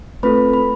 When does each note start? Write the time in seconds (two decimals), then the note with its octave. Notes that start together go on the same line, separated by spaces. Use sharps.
0.23 A3 C4 F4 A4 B4 B5
0.54 B5